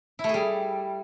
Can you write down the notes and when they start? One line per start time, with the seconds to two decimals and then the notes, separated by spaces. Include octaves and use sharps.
0.19 E4
0.24 A3
0.29 G#4
0.34 G3